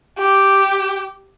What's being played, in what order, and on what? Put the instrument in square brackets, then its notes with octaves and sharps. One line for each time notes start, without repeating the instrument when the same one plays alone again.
[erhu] G4